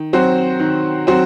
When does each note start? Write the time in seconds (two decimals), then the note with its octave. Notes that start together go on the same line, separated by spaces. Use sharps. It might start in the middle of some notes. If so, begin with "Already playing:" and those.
Already playing: D#3
0.13 F#3 C4 F#4 C5
0.59 D#3
1.07 F#3 C4 F#4 C5